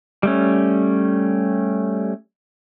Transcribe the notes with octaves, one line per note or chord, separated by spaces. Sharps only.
G3 A3 C#4